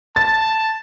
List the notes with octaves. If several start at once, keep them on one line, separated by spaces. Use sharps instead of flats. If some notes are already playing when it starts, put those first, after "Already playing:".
A5 A6